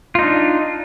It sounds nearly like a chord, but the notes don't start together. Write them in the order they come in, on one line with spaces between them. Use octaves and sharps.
F4 D#4 D4